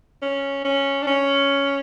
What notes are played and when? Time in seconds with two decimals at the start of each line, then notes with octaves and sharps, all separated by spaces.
0.22 C#4
0.65 C#4
1.02 D4
1.07 C#4